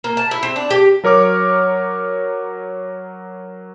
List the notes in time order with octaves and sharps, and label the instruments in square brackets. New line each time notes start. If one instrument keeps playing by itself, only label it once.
[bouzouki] A#3
A5
E4
C4
D4
G4
[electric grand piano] F#3 A#4 C#5 D6 F6